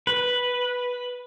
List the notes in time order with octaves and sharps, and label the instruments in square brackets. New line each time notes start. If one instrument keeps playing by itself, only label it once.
[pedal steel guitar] B4